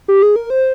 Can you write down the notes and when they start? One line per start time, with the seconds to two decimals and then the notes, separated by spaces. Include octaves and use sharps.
0.08 G4
0.22 G#4
0.36 A#4
0.50 C5